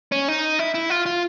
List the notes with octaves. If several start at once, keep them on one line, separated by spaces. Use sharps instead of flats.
C#4
D#4
E4
E4
F4
F4